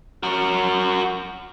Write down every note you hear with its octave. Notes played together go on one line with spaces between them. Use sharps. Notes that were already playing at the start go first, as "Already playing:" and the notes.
F#4 A#4